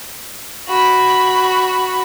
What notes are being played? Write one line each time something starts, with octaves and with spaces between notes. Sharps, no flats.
F#4 B5